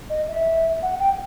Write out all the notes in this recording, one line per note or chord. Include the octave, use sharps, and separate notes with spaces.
D#5
E5
F#5
G5